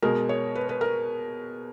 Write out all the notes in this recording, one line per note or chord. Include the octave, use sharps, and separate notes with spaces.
B2 G#3 A#4
C#5
B4
B4
A#4